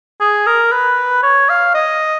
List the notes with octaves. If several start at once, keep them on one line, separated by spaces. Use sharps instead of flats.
G#4
A#4
B4
C#5
F5
D#5